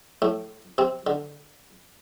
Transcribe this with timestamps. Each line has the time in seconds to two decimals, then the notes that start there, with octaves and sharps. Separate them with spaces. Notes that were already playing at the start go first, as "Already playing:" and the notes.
0.22 A2 A3
0.78 C3 C4
1.07 D3